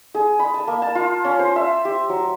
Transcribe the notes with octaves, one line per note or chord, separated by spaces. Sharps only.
G#4
B5
A5
A#3
A5
F4
C#4
C5
E5
G4
F#3